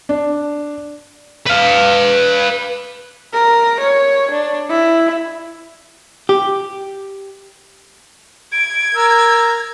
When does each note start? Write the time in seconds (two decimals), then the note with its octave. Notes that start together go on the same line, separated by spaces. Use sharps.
0.09 D4
1.47 B4 F5
3.33 A#4
3.81 C#5
4.32 D4
4.70 E4
6.29 G4
8.52 G#6 D7
8.95 A#4 E6